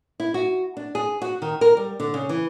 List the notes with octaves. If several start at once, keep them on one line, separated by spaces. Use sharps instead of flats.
E4
F#4
D4
G#4
F#4
D#3
A#4
G3
D3
C#3
E3